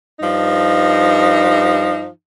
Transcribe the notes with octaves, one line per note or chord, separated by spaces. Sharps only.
G2 F3 D#4